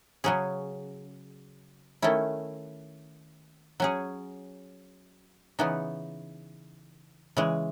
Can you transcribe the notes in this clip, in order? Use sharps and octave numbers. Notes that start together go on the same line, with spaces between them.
C#3 F#3 C#4 G#4
D#3 A3 C#4 E4
F#3 C#4 G#4
C#3 E3 B3 D#4
C#3 E3 G#3